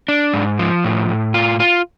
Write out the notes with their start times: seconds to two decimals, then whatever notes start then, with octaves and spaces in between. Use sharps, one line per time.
0.08 D4
0.34 G#2
0.59 F3
0.84 A2
1.09 A2
1.34 F4
1.60 F4